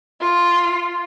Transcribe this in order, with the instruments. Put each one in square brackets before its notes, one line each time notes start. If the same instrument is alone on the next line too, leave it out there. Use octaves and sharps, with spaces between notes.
[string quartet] F4